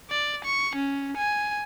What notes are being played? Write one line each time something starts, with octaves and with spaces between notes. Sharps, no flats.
D5
C#6
C#4
G#5